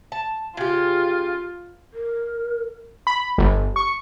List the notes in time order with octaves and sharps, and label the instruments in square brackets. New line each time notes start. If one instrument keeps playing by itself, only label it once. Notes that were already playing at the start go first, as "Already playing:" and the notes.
[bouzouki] A5
[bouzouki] C#3 G4 [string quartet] F4
[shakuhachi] A#4
[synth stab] B5
G1
C#6